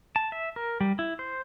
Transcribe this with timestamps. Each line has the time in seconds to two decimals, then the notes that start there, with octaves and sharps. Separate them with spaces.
0.16 A5
0.32 E5
0.56 A#4
0.81 G3
0.99 E4
1.19 C5